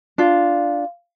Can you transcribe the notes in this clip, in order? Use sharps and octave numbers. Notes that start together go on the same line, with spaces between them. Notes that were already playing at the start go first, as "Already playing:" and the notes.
D4 F4